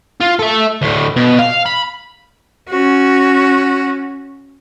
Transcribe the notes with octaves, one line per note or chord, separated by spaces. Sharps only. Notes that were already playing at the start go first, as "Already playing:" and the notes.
F4
A4 E5
D2 A2
B2
F5
B5
C#4 F#4